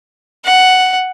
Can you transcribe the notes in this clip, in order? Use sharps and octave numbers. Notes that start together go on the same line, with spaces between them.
F#5